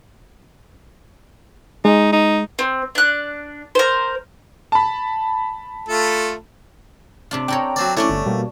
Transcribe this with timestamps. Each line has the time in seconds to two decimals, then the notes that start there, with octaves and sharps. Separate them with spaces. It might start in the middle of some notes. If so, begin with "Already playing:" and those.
1.85 G#3 D#4
2.13 D#4
2.59 C4
2.95 D4 F#6
3.75 A#4 C5
4.72 A5 B5
5.89 A3 F4 A4
7.31 C3 D4 F4
7.48 D4 A4 C#5 G5 A#5
7.76 F#3 C4 D5
7.97 A3 C#4 D4 E4 C#5 D6
8.09 G1
8.26 B2 G3 A#3